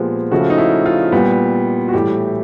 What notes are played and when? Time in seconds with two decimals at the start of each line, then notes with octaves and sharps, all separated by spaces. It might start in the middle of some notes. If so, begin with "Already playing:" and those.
Already playing: A#2 F3 G#3 B3 G4
0.31 C#3 F3 A3 F#4
0.50 D#4
0.58 E4
0.86 F4
1.12 A#2 G3 B3
1.88 F#4
1.93 A2 E3 G3 G4